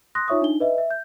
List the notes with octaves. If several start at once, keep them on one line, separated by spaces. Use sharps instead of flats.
C6 D#6 F#6 A#6
D#4 F4 C#5 E5 C#6 D#6
D4 D#4 G7
B4 D#5 E5
E5
G6